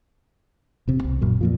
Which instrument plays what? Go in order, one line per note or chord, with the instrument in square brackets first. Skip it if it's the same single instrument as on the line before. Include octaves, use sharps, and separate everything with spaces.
[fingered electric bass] E1 C3
C2
A#1 F#2 A#2
F2 A#2 F3